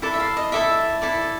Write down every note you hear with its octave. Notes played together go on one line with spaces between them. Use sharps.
E4 A4 D5
E5
F5
D#5
E4 A4 D5 E5
E4 A4 D5